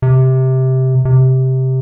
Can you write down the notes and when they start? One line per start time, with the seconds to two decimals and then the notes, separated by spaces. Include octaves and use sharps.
0.02 C3
1.05 C3